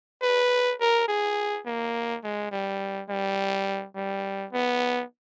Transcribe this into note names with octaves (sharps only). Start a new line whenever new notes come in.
B4
A#4
G#4
A#3
G#3
G3
G3
G3
B3